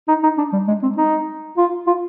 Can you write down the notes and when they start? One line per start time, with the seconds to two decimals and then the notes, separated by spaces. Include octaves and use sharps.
0.08 D#4
0.23 D#4
0.38 D4
0.53 G3
0.68 G#3
0.83 C4
0.97 D#4
1.57 F4
1.87 F4